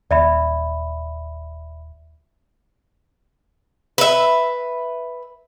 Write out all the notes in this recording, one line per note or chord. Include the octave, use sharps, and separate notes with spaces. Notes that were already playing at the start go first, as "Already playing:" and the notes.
D#1 D5 E5 B5
B4 E5